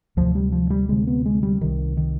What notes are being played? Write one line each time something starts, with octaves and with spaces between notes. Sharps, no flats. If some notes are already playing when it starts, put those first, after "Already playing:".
D2 C3 F3
G3
F3
G3
D2 C3 G#3
B3
G#3
G3
C2 C3 D#3
D#3